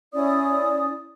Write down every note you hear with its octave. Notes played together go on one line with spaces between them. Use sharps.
C#4 E4 D5 D#6